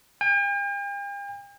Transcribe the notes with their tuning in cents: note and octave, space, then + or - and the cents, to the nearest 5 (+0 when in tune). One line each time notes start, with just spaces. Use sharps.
G5 +45